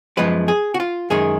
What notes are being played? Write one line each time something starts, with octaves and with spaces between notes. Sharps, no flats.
F#2 F3 G#3 B3 B4
G#4
F#4
F4
F#2 D#3 G#3 G#4